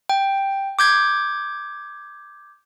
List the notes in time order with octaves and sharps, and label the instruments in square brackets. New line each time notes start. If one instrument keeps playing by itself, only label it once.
[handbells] G5
D6 G6 G#6